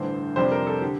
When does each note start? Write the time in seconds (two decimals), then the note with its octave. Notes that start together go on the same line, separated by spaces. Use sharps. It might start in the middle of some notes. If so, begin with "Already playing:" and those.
Already playing: A1 G2 D3 C5
0.36 F2 C3 G3 D4 C5
0.52 A#4
0.67 A4
0.82 D3 G4